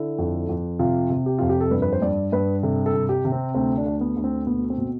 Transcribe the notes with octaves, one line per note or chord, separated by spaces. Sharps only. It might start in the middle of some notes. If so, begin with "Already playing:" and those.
Already playing: D3 E4
F2
F2
C3 F4
C3
G4
F2 F4
G4
A4
G2 B4
B4
C5
G2 D5
G2 B4
C3 A4
A4
C3
G4
C3
C4
D2 C4
D4
D2
B3
D2
C4
B2 B3
C4
B2